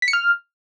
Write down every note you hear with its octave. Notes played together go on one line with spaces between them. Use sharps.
B6
C#7
F6